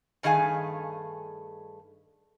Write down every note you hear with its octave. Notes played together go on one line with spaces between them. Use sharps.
G2 D#3 A3 G#4 F5 G#5